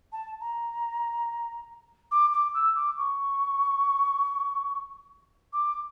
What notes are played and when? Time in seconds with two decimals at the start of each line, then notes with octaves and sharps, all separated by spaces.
0.12 A5
0.39 A#5
2.11 D6
2.32 D6
2.54 E6
2.75 D6
2.96 C#6
5.52 D6